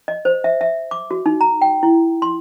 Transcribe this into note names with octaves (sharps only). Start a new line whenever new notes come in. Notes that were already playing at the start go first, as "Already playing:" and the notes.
D#5
C5
E5
E5
D6
F#4
D#4
A#5
G5
E4
C6